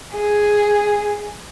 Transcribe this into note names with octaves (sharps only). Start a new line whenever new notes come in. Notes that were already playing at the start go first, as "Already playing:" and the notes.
G#4